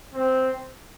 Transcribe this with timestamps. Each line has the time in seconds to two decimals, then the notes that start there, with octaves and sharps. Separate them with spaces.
0.13 C4